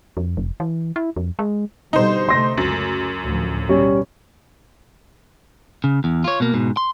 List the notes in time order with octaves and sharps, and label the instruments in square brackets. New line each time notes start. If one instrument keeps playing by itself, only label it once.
[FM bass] F2
F1
E3
E4
F2
G#3
[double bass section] B2 D3 G3 [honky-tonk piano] D#4 C5
[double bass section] C3 A3 [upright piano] C6 A#6
[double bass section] C#2 [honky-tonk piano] F#2
[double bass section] D2 A2 F3
[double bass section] B2 [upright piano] G3 C#4
[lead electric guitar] C#3
E2
F4 C#5
B2 A#3
G#2 B2
C6